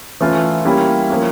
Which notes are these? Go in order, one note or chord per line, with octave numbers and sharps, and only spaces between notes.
E3 A3 C#4 F4
G3 A#3 C#4 E4 G4
F3 A#3 C#4